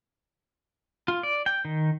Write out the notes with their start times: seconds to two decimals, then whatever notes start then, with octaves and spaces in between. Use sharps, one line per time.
1.08 F4
1.23 D5
1.46 G5
1.65 D#3